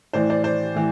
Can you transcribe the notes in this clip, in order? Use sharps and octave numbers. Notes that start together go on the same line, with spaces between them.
A2 E3 C5 D5
C5 D5
C5 D5
A2 E3